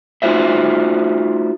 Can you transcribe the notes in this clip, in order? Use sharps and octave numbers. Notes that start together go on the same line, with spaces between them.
A3 D#4 F4 F#4 C5 E5